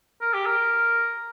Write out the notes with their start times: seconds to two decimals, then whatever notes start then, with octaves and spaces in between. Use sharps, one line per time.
0.21 A#4
0.34 G4
0.46 A#4